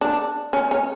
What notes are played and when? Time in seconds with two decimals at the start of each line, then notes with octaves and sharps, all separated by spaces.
0.01 D4
0.53 C#4
0.71 C#4